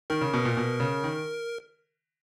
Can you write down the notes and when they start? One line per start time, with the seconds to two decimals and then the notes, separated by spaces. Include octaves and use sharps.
0.10 D#3 A#4
0.21 C#3
0.33 B2
0.45 A#2
0.57 B2
0.80 C#3
1.04 D#3